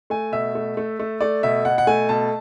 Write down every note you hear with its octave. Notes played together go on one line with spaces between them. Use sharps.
A3 G#5
B2 E5
A3
A3
A3
A3 D5
B2 E5
B2 F#5
F#5
A3 G#5
B2 A5